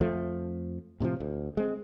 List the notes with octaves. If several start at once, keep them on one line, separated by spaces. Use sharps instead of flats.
F2 F3 A3
A2 C3 E3 F3
D2
G#3 C4